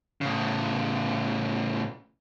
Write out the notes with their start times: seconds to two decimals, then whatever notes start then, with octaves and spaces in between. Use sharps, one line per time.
0.21 A2 C#3